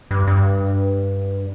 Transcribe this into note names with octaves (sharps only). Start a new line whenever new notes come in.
G2
G2